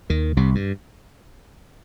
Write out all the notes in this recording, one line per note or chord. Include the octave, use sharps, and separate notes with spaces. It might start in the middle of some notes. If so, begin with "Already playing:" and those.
D#2 D#3
C2 C3
G2